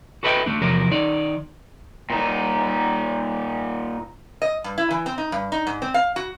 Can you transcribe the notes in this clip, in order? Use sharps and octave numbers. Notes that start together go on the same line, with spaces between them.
F#4 A4 B4 D#5 E5 G5
D#3 A3 D4
E2 C3 F3 F#3 A#4
D#3 D#4 D5
A#2 D#4
D#5
G2
E4
E3
C4
D#4
G2
D#4
G#2
C4
F5
F#4